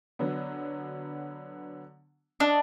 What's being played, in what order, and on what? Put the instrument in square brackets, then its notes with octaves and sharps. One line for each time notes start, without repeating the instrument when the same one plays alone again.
[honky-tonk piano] D3 F#3 B3
[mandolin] D4 [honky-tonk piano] D#5